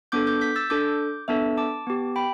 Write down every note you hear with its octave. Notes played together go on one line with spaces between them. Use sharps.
B3 D4 A4 D6 G6
D6 G6
G6 B6
E6 A6
D4 A4 D6 G6
B3 D4 A4 E5 A5
A5 D6
B3 G4
G5 B5